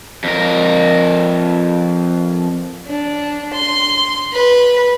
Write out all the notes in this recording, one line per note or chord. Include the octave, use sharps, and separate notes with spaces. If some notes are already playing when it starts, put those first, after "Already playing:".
F2 A#4
D4
C6
B4